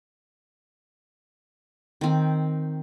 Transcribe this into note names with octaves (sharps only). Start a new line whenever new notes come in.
D#3 C4